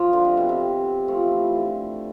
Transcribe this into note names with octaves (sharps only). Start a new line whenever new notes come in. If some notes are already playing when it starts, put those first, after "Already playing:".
Already playing: F3
D3
C3
B2
C3
F3 A3
E3
D3